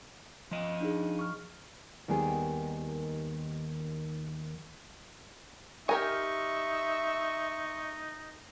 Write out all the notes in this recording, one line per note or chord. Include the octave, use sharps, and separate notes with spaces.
F3 D#5
D4 D#4 G#4
C#6 F6
D#2 D#3 G3 B3 G#4
D#4 G4 A#4 E5 G#5 C#6